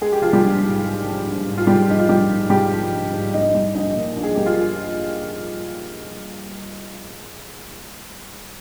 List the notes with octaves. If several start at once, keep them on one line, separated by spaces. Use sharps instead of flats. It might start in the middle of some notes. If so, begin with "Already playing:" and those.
G#3 G#4
G4
F3 F4
G3 G4
A#1
G#2
G#3
F3
A#1
G#2
F4
G3 G#3 G4
F3 D#4
F4
A#1 G3 G4
G#2
G3 G#3 G4
F3
A#1
G#2
A#1 D#4 D#5
G3
A#1 D#4 D#5
A#2
A#1
G#4
G3 G4
F4